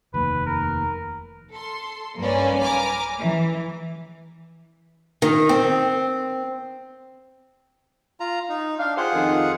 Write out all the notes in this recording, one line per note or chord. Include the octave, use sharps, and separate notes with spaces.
F1 D#2 B4
A#4
A4 C6
B1 G2 A#3 C#4 B4 D5
B4 G#5 A#5 D6 F6
E3
D#3
C4
F4 A#5
D#4
D4 F5
F4 G4 G#4 C5 F#5
F2 D#3